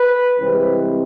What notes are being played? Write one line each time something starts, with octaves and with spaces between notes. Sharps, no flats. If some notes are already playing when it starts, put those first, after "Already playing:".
Already playing: B4
C2 C3 E3 G#3 C4 B4